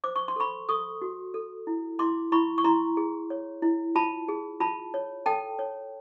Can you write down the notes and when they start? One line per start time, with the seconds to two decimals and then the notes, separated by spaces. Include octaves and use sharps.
0.04 C5 D6
0.16 C#6
0.28 C6
0.36 A4 B5 C#6
0.69 A4 C#6 D#6
1.01 F#4
1.34 A4
1.67 E4
1.99 E4 C6 D6
2.32 E4 B5 C#6
2.58 C#6
2.64 E4 A#5 C6
2.97 G#4
3.30 C#5
3.62 E4
3.95 F4 A5 B5
4.28 G#4
4.60 F4 A5 B5
4.94 C#5
5.26 A4 G5 A5
5.59 C#5